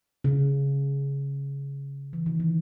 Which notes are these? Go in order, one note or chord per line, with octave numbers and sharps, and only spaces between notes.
C#3
E3
D#3
E3